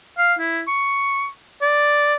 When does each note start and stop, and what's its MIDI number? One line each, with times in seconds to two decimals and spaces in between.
0.18 0.34 77
0.39 0.61 64
0.68 1.27 85
1.62 2.15 74